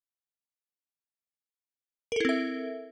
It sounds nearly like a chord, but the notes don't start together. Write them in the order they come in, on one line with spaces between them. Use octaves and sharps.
A#4 A4 E4 C4 E5